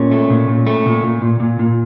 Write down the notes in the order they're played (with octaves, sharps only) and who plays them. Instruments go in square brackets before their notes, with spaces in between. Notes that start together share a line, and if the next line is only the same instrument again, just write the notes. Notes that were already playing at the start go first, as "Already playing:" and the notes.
Already playing: [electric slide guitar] A#2 C#4
A3
A#2
A#2
A3
A#2
A#2
A#2
A#2
A#2